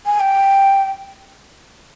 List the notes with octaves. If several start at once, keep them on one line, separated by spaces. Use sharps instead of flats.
G#5
G5